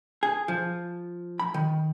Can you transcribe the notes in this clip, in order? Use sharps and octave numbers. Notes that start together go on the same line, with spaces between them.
G#4
F3
B5
D#3